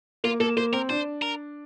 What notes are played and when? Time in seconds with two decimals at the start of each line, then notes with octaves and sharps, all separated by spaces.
0.24 A#3 F4
0.40 A#3 A4
0.57 A#3 C5
0.73 C4 A#4
0.89 D4 C5
1.22 A#4